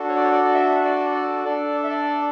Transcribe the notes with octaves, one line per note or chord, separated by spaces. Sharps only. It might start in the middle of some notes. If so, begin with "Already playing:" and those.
Already playing: D4 F#4 A4
C#5
D5
C#5
D5
D5
E5
D5
D5
D4 A4 D5
E5
D5